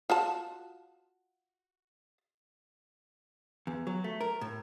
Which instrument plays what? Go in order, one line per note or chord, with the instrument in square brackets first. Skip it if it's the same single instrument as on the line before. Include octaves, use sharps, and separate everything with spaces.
[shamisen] F4 F#4 A5
[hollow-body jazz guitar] E2
F#3
A3
A#4
A2